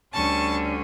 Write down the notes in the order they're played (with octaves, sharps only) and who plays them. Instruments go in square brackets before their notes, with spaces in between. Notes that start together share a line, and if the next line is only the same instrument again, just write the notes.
[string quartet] D2 D3 G3 C#4 A5 C#6